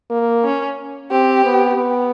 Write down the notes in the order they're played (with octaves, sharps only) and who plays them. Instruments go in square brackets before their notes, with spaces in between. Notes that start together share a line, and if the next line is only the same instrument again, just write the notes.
[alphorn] A#3
[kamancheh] C#4
[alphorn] C4 [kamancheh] G4
[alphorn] B3
B3